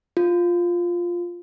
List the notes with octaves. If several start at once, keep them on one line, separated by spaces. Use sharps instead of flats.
F4